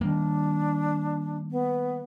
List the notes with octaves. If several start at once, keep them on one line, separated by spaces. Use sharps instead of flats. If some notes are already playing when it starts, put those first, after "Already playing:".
D#3 G3 A#3 D4
B3